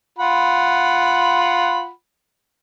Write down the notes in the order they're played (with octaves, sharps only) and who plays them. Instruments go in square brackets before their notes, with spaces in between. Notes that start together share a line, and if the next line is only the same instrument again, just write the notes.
[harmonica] F4 F#5 B5